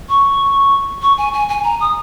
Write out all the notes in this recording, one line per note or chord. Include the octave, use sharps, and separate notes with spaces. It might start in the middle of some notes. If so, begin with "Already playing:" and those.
C#6
C#6
G#5
G#5
G#5
A#5
D#6